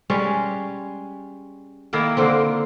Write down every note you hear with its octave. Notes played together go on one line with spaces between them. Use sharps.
G3 G#3 C#4
D#3 A#3 E4 A#4
D3 A#3 C4